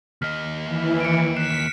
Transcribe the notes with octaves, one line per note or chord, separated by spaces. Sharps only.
D#2 D#5 F6 B6
E3
C#7 D7
F#6 B6 C7 E7